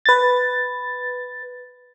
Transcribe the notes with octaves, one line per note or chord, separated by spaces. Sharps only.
B4 A6